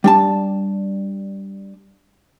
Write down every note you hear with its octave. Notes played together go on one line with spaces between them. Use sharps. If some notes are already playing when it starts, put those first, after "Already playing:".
G3 D4 A5